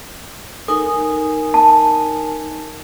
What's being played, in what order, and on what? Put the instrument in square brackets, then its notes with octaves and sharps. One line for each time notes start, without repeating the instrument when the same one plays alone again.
[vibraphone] D#4 A#4 G#5 [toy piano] A4
[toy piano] A5